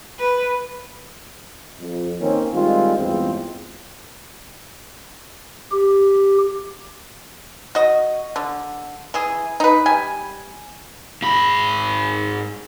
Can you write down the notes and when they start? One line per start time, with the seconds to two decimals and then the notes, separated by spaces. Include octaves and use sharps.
0.20 B4
1.79 F2
2.20 D#3 A#3 C4 C#4
2.54 D#3 G3 G#3 C4 F4
2.97 E2 G2 G#3 C4 F4
5.72 G4
7.75 F#4 D#5
8.36 D3
9.14 E3 G#4
9.60 D#4 B4
9.86 G3 G#5
11.22 G#2 B5